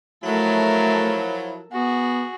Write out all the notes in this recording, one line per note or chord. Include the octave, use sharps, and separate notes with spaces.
F3 F#3 A3 E4 A4 A#4
B3 F#4 G#4